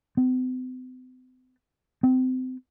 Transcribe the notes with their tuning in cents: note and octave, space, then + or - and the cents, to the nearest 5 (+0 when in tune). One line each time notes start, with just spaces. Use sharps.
C4 -45
C4 -30